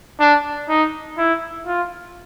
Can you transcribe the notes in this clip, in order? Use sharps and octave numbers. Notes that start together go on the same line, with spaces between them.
D4
D#4
E4
F4